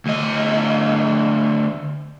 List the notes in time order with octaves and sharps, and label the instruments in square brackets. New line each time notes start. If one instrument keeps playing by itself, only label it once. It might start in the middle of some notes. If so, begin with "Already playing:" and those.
[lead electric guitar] D2 D#5